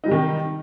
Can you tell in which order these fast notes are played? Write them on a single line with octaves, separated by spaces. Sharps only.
D#4 G3 C3 D#3